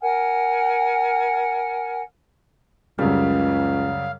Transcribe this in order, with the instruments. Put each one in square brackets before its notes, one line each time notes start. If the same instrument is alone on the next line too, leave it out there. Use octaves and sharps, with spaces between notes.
[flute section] A#4 F#5 G#5 F6
[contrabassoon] C#2 [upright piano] F#2 C#3 G3 [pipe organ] F5